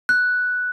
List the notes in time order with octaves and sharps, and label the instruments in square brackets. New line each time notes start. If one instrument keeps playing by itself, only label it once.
[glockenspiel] F#6